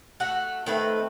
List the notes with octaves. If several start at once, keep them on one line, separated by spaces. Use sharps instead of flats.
A3 F#4 F#5
D#3 A3 C4 B4